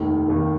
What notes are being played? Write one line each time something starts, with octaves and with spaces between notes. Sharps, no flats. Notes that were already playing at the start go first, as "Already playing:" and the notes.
Already playing: F1 D#2 D#3
F1 D#2 D#3